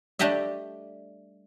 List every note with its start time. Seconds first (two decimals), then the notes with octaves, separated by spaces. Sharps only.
0.19 G3 A3 D4 G4 D#5 E5